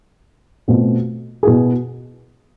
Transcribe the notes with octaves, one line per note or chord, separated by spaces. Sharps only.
B2 A3 C4 F4
B2 B3 E4 G#4